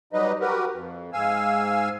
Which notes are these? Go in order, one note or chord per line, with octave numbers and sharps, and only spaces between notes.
F#3 G3 D#4 B4 D#5
F#4 G4 A#4 B4
F2
G#2 F5 G#5 E6